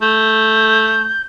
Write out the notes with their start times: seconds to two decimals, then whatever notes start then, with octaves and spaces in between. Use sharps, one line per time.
0.02 A3 G6